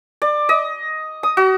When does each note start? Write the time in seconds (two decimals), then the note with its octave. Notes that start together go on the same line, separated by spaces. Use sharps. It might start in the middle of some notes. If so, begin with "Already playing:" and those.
0.22 D5
0.49 D#5
1.23 D#6
1.37 F#4